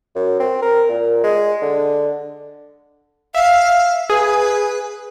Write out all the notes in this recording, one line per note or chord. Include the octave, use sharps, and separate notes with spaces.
F#2
C4
A#4
A#2
G#3
D3
E5 F5
G#4 B4